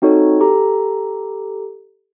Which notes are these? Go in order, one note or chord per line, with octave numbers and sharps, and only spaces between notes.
C4 D#4 F#4 A4 C#5
G4 A4 A#5